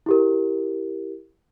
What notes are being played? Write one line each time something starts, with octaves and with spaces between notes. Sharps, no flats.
E4 G4 A#4